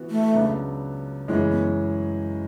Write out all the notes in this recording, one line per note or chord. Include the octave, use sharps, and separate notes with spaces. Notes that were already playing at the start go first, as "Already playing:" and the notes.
Already playing: E3 B3 F#4
A3
C#2 C#3 F#3 B3 D4
F#2 C#3 E3 G#3 A3 C#4
B3